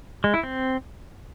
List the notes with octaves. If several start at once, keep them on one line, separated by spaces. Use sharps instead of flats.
G#3
E4
C4